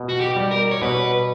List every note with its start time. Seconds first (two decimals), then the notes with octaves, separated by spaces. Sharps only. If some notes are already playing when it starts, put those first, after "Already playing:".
Already playing: B2
0.09 F#4
0.21 G4
0.36 G3
0.51 A#4
0.71 C#5
0.82 B2 B4